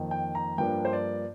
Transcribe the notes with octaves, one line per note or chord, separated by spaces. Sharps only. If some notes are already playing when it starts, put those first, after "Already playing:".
Already playing: F2 D#3 A#3
G5
A#5
G2 F3 A#3 D4 G5
C5
D5